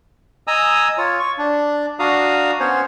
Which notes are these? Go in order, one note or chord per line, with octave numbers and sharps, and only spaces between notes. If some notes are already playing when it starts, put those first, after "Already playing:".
D#5 G#5 A#5 D#6 E6
F4 C#5
C#6
D4
D4 F#4 F5 A#5 D#6
B3 C#4 C5 C#5